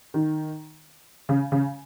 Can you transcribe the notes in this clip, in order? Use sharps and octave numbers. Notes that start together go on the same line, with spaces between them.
D#3
C#3
C#3